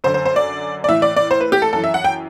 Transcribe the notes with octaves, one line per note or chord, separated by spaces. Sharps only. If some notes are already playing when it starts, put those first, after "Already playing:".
F#2 D3 C5
C5
C5
D5
D5
A2 E3 E5
D5
D5
C5
B4
G4
A4
F#2 E3 A4
E5
F#5
G5